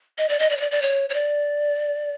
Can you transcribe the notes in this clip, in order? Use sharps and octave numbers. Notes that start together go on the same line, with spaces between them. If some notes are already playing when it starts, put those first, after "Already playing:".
D#5
D5
D#5
D5
C#5
D5
D5
C#5
C#5
D5